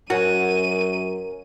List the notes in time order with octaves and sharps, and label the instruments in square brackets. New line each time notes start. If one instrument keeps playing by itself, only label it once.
[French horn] F#2 [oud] F#4 [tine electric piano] A#4 C#5 G#5 [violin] D#7